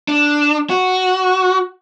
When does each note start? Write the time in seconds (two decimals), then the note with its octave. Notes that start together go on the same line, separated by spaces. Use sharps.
0.08 D4
0.70 F#4